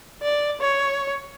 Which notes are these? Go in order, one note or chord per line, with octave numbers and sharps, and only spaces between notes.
D5
C#5